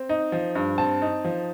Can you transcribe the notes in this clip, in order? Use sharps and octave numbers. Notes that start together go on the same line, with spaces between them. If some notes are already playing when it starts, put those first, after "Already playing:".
Already playing: C4
D#4
F3
G2
C4 A5
D#4
F3